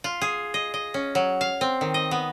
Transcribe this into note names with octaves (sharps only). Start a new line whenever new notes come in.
F4
G#4
D#5
D#5
C#4
F#3
F5
C4
D#3
D#5
B3